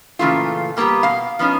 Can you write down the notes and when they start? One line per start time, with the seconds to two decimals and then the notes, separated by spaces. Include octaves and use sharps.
0.19 A#2 C#3 E3 A3 F4
0.77 G3 A#3 B3 F#4 G4
1.03 B2 F5
1.39 F3 B3 C#4 D#4